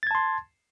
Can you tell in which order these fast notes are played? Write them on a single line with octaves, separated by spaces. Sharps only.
A6 G#6 A5 C6